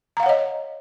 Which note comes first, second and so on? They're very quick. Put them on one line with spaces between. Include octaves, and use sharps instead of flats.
A#5 F5 F#5 C#5 D#5